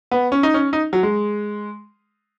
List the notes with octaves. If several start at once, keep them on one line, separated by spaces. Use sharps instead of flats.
B3
C#4
D#4
C#4
D#4
F#3
G#3